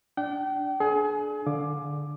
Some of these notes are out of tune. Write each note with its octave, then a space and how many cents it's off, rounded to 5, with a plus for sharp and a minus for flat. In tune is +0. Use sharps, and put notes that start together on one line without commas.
D4 +0 G5 -35
D4 +0 G#4 +35 G#5 +20
D3 +0 F5 +10 D6 +10